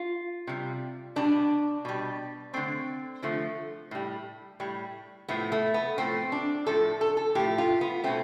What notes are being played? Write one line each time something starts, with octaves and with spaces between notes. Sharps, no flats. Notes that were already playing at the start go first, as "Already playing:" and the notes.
Already playing: F4
C3 G3
B2 G3 D4
B2 G3
D3 F3 A3 C4
D3 F3 A3
A2 G3
A2 G3
A2 F3 A3 B3
A3
B3
A2 F3 A3 C4
D4
A2 F3 A3 A4
A4
A4
A2 F3 A3 G4
F4
B3
B2 A3 C4